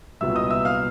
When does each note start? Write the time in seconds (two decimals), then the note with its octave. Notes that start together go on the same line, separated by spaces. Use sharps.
0.21 C2 A#2 F#3 B3 E5 E6
0.35 D#5 D#6
0.50 E5 E6
0.65 F5 F6